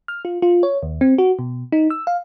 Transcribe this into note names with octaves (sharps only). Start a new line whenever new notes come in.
F6
F4
F4
C#5
D#2
C4
F#4
B2
D#4
E6
F5